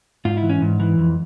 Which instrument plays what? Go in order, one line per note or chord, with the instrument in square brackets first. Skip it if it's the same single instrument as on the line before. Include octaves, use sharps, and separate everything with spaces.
[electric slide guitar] G#2 F4
E4
E3
C#4
G#2
E3
F2